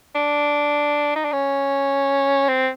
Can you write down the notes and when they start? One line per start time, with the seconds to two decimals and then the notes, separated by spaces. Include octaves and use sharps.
0.15 D4
1.16 D#4
1.24 D4
1.32 C#4
2.49 C4